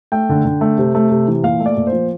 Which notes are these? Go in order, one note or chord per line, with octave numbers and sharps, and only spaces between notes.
A3 G5
D3
D3
A3
C3
A3
C3
E3
A#2 F5
A3
D5
A#2
C5
F3